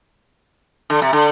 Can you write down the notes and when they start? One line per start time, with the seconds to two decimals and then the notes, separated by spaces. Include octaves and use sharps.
0.90 D3
1.02 C3
1.13 D3